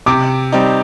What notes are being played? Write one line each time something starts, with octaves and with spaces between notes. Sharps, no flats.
C3 D6
G3 C4 D#4